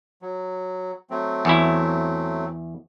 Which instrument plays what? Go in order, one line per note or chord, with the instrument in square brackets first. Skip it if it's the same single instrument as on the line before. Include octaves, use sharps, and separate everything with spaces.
[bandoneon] F#3
F#3 A3 C4
[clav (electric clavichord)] E2 E4